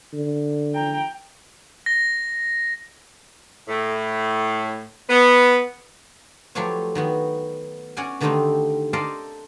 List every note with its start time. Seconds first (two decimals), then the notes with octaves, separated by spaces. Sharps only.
0.13 D3
0.74 G5 A#5
1.86 A#6
3.67 A2
5.09 B3
6.55 F3 F#3 A3 G4 B4 C#5
6.95 D#3 B3 F#4
7.97 C#4 F#4 C#5 D5 F#5 G#5
8.20 D3 D#3 G3 A3 C4 D#4
8.93 A4 A#4 C5 D5 D#5 F5